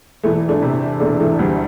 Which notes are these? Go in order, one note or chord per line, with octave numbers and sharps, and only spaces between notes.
E1 E3 A3
A3 D4
C3
E1 A3 D4
E3 A3
D2 G3